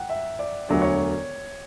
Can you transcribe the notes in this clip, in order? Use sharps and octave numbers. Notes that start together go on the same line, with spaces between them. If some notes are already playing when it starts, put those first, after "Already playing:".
Already playing: F#5 G5
E5
D5
E1 D2 D3 F#3 D5
C#5